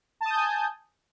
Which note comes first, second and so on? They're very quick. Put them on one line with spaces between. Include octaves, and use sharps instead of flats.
A5 D#6 G6 G#5